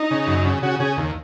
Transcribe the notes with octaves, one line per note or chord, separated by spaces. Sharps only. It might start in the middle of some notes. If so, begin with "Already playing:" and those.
Already playing: D#4
C#3
F#2
C#3
C#3 F#4
C#3 G#4
D#2